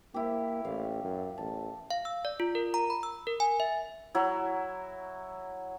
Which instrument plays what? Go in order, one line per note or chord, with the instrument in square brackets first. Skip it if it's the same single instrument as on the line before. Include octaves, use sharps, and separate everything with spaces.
[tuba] A#3 [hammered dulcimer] E4 G4
[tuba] A1 [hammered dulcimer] F5
[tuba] F#2
[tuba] A1 [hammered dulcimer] A5
[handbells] F5
E6
D5
F4
A#4
A#5
B5
E6
A#4
G#5
E5
[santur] F#3 E4